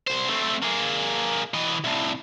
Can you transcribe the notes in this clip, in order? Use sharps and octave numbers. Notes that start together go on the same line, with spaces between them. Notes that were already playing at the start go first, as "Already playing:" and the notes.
C2 C5
A3 C4
A#3 G#4
E3 D#5
C2 A2